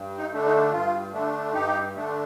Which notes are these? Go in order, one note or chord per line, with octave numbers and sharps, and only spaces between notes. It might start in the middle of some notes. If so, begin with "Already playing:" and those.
Already playing: G2
D#4
D3 A3 D4
D#4
G2 F4
D3 A3 D4
G2 D#4 G4
D3 A3 D4